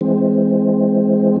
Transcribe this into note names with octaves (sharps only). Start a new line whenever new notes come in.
E3 G#3 C4